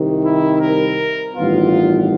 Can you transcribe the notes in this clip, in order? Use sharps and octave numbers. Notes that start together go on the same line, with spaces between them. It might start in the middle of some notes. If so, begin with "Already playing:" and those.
Already playing: C2 C3 D#3
E4
A#4
A1 G2 D#3 F#3 B3 F4